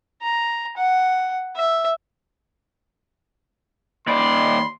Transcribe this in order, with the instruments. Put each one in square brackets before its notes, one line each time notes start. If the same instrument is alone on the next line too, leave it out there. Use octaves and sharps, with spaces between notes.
[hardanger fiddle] A#5
F#5
E5
[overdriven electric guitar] D#2 D5 [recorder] B5 [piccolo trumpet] C6